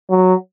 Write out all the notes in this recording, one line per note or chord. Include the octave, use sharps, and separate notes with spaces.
F#3